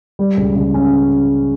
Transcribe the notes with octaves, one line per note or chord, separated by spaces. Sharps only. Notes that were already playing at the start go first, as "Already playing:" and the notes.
G3
C#2
C#3
C#4